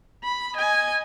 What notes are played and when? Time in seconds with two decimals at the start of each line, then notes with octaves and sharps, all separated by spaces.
0.24 B5
0.55 D#5 G#5